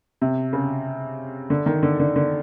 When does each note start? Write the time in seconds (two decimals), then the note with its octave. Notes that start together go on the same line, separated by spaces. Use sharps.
0.22 C3
0.53 C#3
1.50 D3
1.66 D#3
1.83 D3
2.00 D3
2.16 D3